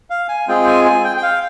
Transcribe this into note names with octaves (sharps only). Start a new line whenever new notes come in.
F5
G#5
G#3 C4 F4 G#4 G5
G#5
G#5
G5
G5
F5